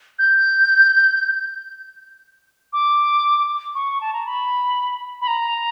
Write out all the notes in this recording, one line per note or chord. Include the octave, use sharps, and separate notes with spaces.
G6
D6
C#6
A5
A#5
B5
B5
A#5